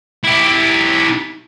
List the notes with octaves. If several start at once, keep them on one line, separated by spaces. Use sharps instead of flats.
E4 G4